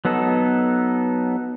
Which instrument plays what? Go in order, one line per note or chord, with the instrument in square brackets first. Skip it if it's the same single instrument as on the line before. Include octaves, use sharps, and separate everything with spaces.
[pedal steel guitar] F#3 B3 D#4 A4